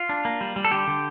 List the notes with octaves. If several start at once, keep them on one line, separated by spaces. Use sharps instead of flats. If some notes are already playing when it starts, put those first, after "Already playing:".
Already playing: F4
D4
A#3
G3
G3
A4
D3 G4
D3